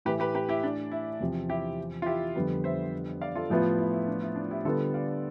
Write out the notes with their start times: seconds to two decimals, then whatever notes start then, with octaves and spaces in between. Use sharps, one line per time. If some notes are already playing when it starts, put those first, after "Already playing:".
0.05 A2 E3 A3 G4 B4
0.20 G4 B4
0.35 G4 B4
0.49 E4 G4
0.63 D4
0.92 E4
1.20 E2 C3 F3 C4
1.49 E4 G4
2.02 F4
2.06 E4 G4
2.35 F2 D3 G3 B3
2.64 C5 E5
3.21 D5 F5
3.36 F4 A4
3.50 A2 F3 B3 E4 F4 G4
3.78 E4
3.94 E4
4.08 D4
4.22 E4
4.36 D4
4.51 E4 G4
4.65 D3 G3 B3 F4 A4
4.94 D5 F5